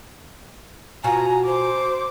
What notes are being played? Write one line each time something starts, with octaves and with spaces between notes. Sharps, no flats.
B2 F4 F#4 G#5 A#5
C5 D6